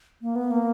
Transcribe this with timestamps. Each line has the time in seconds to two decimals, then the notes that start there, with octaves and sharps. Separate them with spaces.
0.22 A#3
0.36 B3
0.51 A#3